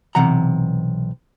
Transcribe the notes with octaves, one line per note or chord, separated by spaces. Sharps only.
B1 C3 E3 F#5 A#5